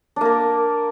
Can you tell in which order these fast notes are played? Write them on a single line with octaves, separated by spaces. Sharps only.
D4 A#3 A#4